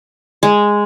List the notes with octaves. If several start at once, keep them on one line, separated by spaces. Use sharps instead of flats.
G#3